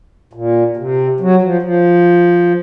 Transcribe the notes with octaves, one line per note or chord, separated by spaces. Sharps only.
A#2
C3
F#3
F3
F3